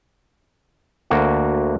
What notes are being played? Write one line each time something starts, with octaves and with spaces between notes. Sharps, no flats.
D2 A#3 F#4